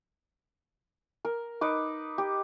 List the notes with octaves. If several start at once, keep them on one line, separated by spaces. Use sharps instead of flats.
A#4
D#4 B4 D6
G4